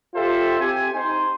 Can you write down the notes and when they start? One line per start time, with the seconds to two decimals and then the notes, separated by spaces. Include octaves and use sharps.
0.15 F4 G4 A4 C5 E5
0.59 C4 G4 G#5
0.95 D#4 C5